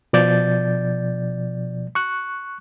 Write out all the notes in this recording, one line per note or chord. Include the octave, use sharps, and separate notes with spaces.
B2 F3 D5 G6 A6
C#6 F#6